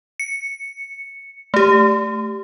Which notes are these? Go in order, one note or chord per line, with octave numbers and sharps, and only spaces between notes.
C#7
A3 G4